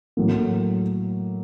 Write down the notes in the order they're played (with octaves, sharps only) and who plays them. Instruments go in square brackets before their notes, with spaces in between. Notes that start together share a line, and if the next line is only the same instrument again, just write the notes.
[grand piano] A2 F#3 A#3